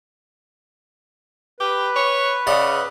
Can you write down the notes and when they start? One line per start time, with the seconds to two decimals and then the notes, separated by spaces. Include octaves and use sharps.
1.60 G4 B4
1.96 C#5
2.47 C#3 D5 D#5 F#5